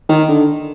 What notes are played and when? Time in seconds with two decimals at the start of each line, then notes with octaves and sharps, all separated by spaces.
0.09 D#3
0.29 D3